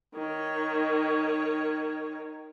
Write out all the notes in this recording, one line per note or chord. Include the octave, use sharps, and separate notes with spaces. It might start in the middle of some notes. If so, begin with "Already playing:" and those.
D#3 C#5